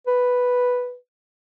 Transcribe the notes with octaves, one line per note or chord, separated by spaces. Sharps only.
B4